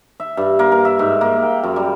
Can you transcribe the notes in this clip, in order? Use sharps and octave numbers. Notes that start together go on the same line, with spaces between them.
E5
G2
A#3
A#4
E5
G#2
A#3
G5
F#2
G3